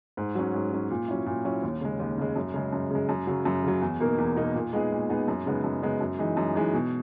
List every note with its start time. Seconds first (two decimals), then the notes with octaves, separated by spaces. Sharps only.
0.17 G#2
0.35 F#3 C#4
0.54 G#2
0.72 F#3 C#4
0.90 A#2
1.08 F#3 C#4 E4
1.26 A#2
1.45 F#3 C#4 E4
1.63 D#2
1.81 C#3 G#3
2.00 D#2
2.18 C#3 G#3
2.36 F#2
2.54 C#3 G#3
2.72 F#2
2.91 C#3 G#3
3.09 F#2
3.27 C#3 F#3
3.45 F#2
3.63 C#3 F#3
3.82 E2
4.00 B2 A#3 D#4 A#4
4.18 E2
4.36 B2 A#3 D#4 A#4
4.55 A#2
4.73 G#3 B3 D#4 G#4
4.92 A#2
5.10 G#3 B3 D#4 G#4
5.28 F#2
5.46 C#3 G#3 B3 D#4
5.64 F#2
5.82 C#3 G#3 B3 D#4
6.01 F#2
6.19 E3 G#3 D#4
6.37 F#2
6.55 E3 G#3 D#4
6.74 B2